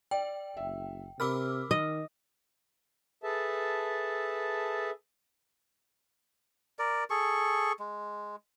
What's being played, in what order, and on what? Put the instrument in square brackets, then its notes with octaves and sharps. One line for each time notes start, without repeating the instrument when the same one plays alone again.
[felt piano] D5 [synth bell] G5
[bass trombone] F#1 [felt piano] E5
[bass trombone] C3 [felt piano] A#4 B5 [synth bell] D6 E6 F6
[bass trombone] D#3 [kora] D#5
[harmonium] G#4 A4 B4 E5 A5
[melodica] A#4 D5
G#4 A4 C#6
G#3